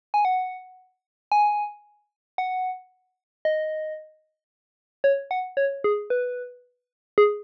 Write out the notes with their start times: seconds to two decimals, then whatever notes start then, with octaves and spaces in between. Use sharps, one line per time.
0.14 G#5
0.25 F#5
1.32 G#5
2.38 F#5
3.45 D#5
5.04 C#5
5.31 F#5
5.57 C#5
5.84 G#4
6.10 B4
7.18 G#4